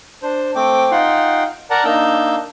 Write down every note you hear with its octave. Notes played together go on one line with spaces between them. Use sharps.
D4 C5
A3 C4 G5 D6
D#4 F4 F#5 G5 C6
A#4 D5 F#5 A5 A#5
A#3 D4 D#4 E6 G6